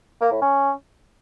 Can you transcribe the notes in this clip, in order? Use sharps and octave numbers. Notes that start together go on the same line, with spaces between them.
A#3
A2
C#4